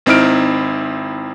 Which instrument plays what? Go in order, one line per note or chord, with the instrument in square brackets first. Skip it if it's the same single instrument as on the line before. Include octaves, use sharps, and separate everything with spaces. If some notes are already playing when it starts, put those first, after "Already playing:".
[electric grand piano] G#1 C4 D#4 E4 F6 D7